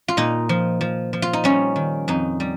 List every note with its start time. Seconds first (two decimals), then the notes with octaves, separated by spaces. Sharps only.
0.08 F4
0.17 A#2 D#4
0.49 F3
0.81 F3
1.13 F3
1.22 F4
1.33 D#4
1.44 G3 C#4
1.76 D#3
2.08 F2 D#4
2.40 G3